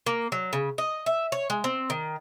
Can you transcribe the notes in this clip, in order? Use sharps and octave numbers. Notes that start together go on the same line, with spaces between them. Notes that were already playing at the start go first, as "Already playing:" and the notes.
A#3
F#3
C#3
D#5
E5
C#5
G#3
C4
D#3